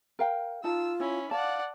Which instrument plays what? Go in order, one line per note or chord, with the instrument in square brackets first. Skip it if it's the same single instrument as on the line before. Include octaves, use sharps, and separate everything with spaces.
[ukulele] A#4 F5 G5
[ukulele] D#4 A5 [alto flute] F4 [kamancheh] E6
[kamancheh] C#4 B5 [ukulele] E4
[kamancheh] D5 F#5 [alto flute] F5 [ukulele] A5